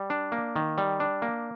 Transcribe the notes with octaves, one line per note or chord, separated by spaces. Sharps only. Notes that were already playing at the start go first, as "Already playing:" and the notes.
Already playing: G3
D4
A#3
D#3
G3
D4
A#3